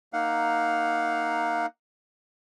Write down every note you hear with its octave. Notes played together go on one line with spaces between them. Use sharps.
A#3 D#4 F5 F#5